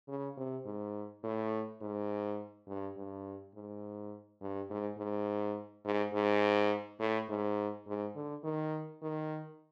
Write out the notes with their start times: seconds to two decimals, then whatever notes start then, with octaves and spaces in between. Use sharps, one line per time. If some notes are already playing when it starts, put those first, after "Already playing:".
0.08 C#3
0.37 C3
0.65 G#2
1.23 A2
1.81 G#2
2.67 G2
2.96 G2
3.55 G#2
4.41 G2
4.70 G#2
4.98 G#2
5.85 G#2
6.14 G#2
7.00 A2
7.29 G#2
7.87 G#2
8.16 D3
8.44 D#3
9.02 D#3